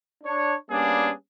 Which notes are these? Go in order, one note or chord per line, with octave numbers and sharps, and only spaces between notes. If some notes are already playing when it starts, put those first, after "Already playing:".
D4 C#5
G3 A#3 B3 C#4 D4 G#4